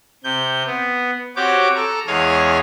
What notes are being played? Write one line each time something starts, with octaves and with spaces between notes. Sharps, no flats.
C3 G6
B3
C4 F#4 G4 C#5 D6
A4 A#5
E2 G#3 C#5 F5 D#6 F6